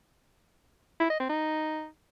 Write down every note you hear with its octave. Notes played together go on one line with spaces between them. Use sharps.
E4
D#5
C4
D#4